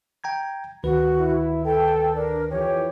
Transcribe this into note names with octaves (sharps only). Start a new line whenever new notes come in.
G5 A#5 G#6
D2 D#3 F#4 B4
E4
A4 G5
D4 A#4
F2 E3 G4 C#5